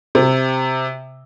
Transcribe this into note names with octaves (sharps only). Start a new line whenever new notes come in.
C3